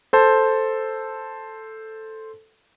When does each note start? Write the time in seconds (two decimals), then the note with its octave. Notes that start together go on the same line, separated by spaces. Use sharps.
0.13 A4 C5 A5